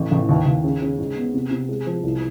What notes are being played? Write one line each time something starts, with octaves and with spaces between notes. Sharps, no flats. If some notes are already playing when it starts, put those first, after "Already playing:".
Already playing: A1
A1
D#2
D#2
C#3
C#3
G#2
B3
C3
C3
G#3
F3
C2